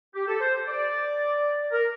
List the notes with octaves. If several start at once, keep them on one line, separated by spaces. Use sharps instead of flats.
G4
A4
C5
D5
A#4